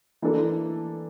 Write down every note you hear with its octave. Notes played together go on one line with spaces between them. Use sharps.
E3 A#3 D4 A4